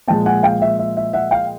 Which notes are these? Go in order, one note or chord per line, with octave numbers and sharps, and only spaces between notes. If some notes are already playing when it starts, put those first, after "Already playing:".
A#2 F3 G#3 G5 A5
F#5 G#5
F5 G5
E5
E5
E5
E5 F#5
F5 G5